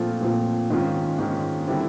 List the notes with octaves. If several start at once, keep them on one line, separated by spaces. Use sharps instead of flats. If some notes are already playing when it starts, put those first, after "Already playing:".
Already playing: A#2 F3 A3 C4 F4
A#2 F3 A3 C4 F4
G#2 D#3 G#3 C#4 F4
G#2 D#3 G#3 C#4 F4
D3 G3 C4 E4